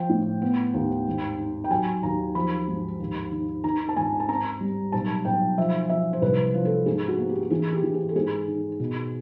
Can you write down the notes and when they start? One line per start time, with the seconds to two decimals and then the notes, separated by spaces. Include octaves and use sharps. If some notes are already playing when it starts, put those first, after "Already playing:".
Already playing: F3 G5
0.09 A2
0.42 B3
0.74 D#2
1.07 G#1
1.39 D#3
1.64 G5
1.70 F#3 G#5
2.03 D#2 A#5
2.35 F3 B5
2.68 G#2
3.00 D#2
3.31 D#3
3.64 D#3 A#5
3.89 A5
3.96 G#1 G#5
4.20 A5
4.28 C4 A#5
4.61 G3
4.92 B1 A5
5.25 B1 G5
5.58 F3 E5
5.89 F3 E5
6.13 C5
6.22 C2 B4
6.54 F3
6.65 A4
6.86 G#2 G#4
7.08 F#4
7.19 A#3
7.29 G4
7.43 G4
7.50 E3 G#4
7.73 G4
7.83 E3
7.94 G#4
8.09 A4
8.15 G#2 G#4
8.48 D#3
8.80 B2